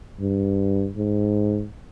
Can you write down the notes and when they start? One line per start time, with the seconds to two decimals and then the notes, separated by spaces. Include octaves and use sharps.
0.20 G2
0.97 G#2